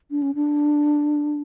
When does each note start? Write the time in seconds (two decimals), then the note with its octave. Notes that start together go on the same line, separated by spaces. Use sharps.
0.11 D4
0.22 C#4
0.35 D4